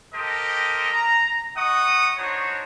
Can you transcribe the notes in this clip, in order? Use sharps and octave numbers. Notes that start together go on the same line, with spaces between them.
G4 A4 A#4 C5 D#5
A#5
D#4 D#5 F#5 C#6 D#6
D4 D#4 F#4 C5 C#5